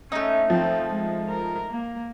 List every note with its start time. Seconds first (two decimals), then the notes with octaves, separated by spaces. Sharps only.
0.12 A3 C#4 D#4
0.50 F3 C4 F4
0.87 G#3
1.29 A#4
1.70 A#3